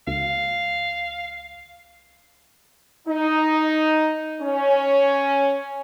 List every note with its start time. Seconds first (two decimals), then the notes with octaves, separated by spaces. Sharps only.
0.07 C#2 F5
3.08 D#4
4.41 C#4